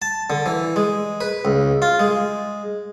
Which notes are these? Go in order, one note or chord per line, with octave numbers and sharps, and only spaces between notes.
A5
D3
E3
G#3
B4
C#2
F4
G#3